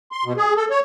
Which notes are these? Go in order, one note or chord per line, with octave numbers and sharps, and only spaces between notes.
C6
B2
G#4
A4
C#5